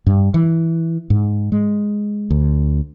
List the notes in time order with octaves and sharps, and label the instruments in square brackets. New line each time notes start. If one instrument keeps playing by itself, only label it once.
[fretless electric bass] G2
E3
G#2
G#3
D2